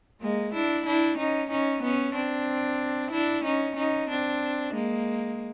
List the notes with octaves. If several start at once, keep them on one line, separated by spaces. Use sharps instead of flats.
G#3 A#3
D4 E4
D4 E4
C#4 D#4
C#4 D#4
B3 C#4
C4 D4
D4 E4
C#4 D#4
C#4 D#4
C4 D4
G#3 A#3